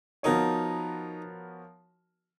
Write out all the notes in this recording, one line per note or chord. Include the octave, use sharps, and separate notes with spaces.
F3 B3 D#4 F#4 A#4 C#5